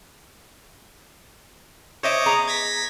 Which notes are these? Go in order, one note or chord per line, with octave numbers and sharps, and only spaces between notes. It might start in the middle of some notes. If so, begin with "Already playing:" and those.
C5 C#5 D#5 E5 D6
B3 G#4 A#5
G#6 A#6 B6